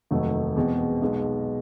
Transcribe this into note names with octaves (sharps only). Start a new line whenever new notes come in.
F1 D#2 D#3 F#3 A3
E2 B2 G#3 C4
B1 B2 G#3